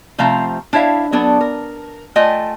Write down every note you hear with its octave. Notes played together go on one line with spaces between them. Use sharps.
C3 F3 A3 C4 F5 A#5
D4 E4 C#5 E5 F5
F#3 B3 D4 A4
A#4
A3 F4 D#5 G5 G#5